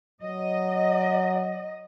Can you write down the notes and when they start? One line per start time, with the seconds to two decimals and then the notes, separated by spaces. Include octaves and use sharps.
0.22 F#3 D#5